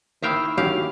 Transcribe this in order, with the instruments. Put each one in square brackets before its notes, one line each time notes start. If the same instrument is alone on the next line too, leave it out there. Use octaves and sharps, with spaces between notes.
[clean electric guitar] D#3 A#3 E4 [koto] E5 F5 G5
[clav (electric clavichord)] F#3 C#4 F#4 [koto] G4 [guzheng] F5